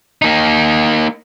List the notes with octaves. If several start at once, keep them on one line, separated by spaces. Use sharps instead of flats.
A#3 D#4